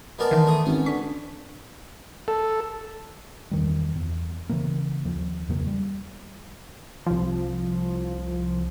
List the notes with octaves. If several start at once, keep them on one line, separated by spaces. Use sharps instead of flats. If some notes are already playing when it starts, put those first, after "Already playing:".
G#3 B3 A#4 D5 A5
D#3 E3
A3 D#6
G#1 C#4
D3 C#6 B6
A4
E2 D#3 G3
E2
C#3 E3 A#3
D#2 F3
E2 C#3 F#3 A#3
G3
C2 F3